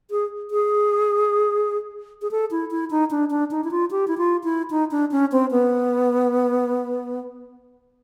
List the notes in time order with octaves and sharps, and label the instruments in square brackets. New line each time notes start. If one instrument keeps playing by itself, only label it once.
[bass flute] G#4
G#4
G#4
A4
E4
E4
D#4
D4
D4
D#4
E4
F4
G4
E4
F4
E4
D#4
D4
C#4
C4
B3